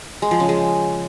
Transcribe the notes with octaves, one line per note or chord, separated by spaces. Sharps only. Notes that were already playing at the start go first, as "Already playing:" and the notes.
G#3
F3
C#3
G#3